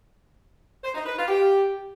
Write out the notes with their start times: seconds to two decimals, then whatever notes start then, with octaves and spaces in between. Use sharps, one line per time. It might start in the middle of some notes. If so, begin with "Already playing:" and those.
0.83 C5
0.95 D#4
1.06 B4
1.17 F4
1.28 G4